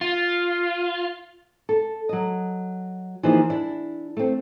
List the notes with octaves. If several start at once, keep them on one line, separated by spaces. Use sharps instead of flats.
F4
A4
F#3 D#5
E3 F3 A#3 D#4 G#4
D4 E4
A3 C4